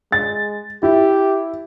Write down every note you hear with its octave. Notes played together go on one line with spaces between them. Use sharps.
G#3 A6
E4 G4